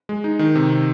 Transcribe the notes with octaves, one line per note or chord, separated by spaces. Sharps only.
G#3
D#4
D#3
C3